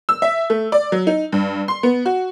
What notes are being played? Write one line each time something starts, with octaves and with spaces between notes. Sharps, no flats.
E6
E5
A3
D5
F#3
D#4
G2
C6
B3
F#4